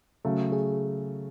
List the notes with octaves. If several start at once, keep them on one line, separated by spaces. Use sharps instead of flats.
C#3 F#3 A3
G#4